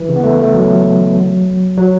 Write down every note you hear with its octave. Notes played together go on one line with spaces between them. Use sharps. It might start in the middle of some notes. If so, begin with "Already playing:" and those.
Already playing: E3
C#3
B3
A3
A3
F#3
F#3